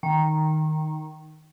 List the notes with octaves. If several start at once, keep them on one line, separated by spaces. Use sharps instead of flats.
D#3